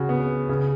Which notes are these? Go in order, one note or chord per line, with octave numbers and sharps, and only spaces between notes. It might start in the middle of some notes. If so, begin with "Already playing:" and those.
Already playing: C#3 F#4
B3
C#3